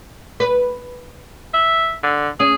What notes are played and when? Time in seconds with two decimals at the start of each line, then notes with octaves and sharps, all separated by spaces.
0.40 B4
1.54 E5
2.03 D3
2.40 C#4 G#4